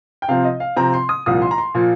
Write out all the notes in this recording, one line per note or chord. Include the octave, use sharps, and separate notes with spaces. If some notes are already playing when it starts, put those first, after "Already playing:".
G5
C3 F3 C4 F5
D#5
F5
C3 F3 C4 A#5
C6
D#6
C2 A#2 F3 D#6
C6
A#5
C6
A#2 F3